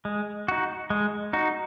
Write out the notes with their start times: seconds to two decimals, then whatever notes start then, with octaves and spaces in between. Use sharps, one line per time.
0.05 G#3
0.48 D#4 F#4
0.90 G#3
1.33 D#4 F#4